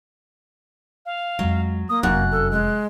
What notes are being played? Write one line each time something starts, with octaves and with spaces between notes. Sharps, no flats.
F5
F2 F#3 G#3
A#3 D#6
F1 F#2 E4 F#6
A4
G#3